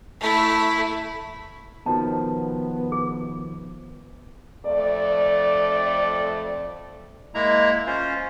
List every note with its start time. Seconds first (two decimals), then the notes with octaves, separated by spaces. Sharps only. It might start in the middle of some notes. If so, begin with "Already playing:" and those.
0.20 A3 E4
1.86 B2 D#3 F3 B3 A5
2.92 G#4
4.65 F2 A3 D5
7.34 G#3 A#3 E4 A#5
7.87 C#4 F4 C5